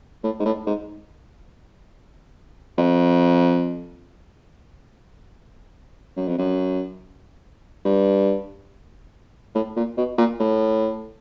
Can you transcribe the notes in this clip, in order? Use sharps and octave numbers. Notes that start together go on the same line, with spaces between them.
A2
G#2
A2
G#2
F2
F#2
F2
F#2
G2
A2
A#2
B2
A#2
A2